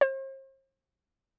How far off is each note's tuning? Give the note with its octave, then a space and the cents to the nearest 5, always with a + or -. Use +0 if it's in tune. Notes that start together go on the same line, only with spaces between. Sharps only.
C5 +40